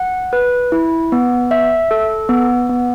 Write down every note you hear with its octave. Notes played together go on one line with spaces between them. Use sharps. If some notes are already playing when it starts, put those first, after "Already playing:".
Already playing: F#5
B4
E4
B3
E5
A4
B3
B3